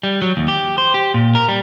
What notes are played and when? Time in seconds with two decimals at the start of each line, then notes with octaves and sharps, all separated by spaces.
0.03 G3
0.22 F#3
0.37 D#2
0.48 G4
0.78 C5
0.94 G4
1.14 A#2
1.35 A#4
1.49 G3